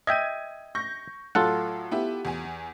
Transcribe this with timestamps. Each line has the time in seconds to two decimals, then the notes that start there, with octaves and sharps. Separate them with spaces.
0.07 D#5 E5 G5 G#6 D#7
0.75 C#6 G6 A#6
1.35 A2 F#3 F4 A4 F#5
1.91 B3 E4 G4
2.25 E2 G#5